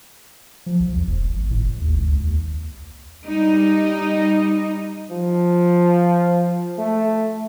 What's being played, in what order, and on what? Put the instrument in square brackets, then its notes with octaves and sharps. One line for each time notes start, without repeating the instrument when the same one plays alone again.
[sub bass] F3
B1
E2
E1
G#1
A2
F#1
D#2
C#2
C#2
D#2
[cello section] G3 D#4
[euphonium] F3
A3